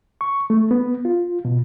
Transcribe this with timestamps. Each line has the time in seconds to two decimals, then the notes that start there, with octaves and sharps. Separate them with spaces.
0.21 C#6
0.50 A3
0.71 B3
1.05 F4
1.45 B2